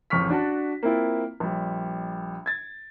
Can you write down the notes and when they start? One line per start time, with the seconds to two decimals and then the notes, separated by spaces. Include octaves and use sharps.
0.10 A1 F2 C#3 C#6 F6 B6
0.30 D4 F#4 A5
0.83 A#3 C4 E4 F4
1.40 A#1 G3
2.46 G#6 A6